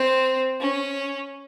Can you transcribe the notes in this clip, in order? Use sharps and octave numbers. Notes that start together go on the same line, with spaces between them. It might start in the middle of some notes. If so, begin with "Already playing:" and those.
Already playing: C4
C#4